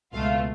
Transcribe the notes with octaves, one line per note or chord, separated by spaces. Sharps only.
C#2 B2 A3 F4 F5